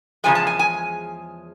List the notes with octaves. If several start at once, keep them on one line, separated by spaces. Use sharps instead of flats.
E2 C#3 F3 G#3 G#5
A5
G#5
G#5